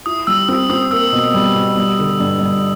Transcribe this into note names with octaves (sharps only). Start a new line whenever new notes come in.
E4 D#6
G3 E6
C4 E6
C4 D#6
A#3 E6
B2
G3
B2
G3
D3
G2
G2